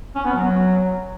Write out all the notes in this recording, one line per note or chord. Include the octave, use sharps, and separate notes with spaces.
C#4
B3
F#3